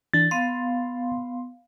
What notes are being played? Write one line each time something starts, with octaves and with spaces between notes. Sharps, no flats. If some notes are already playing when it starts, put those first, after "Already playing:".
E3 D4 A6
B3 F5 C6